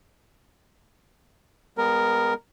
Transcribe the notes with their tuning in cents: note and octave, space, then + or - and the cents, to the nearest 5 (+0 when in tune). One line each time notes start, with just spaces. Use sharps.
G#3 -35 B3 +0 A#4 +0